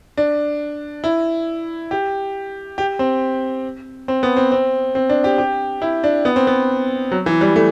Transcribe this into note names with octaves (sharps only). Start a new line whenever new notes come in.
D4
E4
G4
G4
C4
C4
B3
C4
C4
C4
D4
G4
G4
E4
D4
B3
C4
B3
F#3
E3
G3
A3